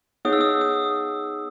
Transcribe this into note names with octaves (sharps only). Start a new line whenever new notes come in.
B3 D#4 G#4 C#5 F#5 D#6
E6
D#6
D#6